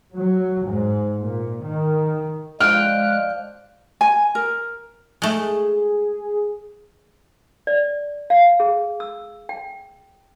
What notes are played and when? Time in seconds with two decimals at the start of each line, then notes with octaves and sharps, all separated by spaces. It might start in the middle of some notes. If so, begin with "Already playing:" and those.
0.15 F#3
0.68 G#2
1.21 A#2
1.64 D#3
2.60 F3 G#3 D5 G5 F6 F#6
4.01 G#5
4.35 A#4
5.22 G#3 A3 G#4
7.67 D5
8.30 F5
8.60 G#4
9.00 E6
9.49 G5